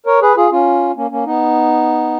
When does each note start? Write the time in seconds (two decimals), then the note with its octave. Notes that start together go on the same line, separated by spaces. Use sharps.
0.06 A#4 C#5
0.22 G#4 B4
0.37 F4 G#4
0.52 C#4 F4
0.96 A#3 C#4
1.11 A#3 C#4
1.25 B3 D#4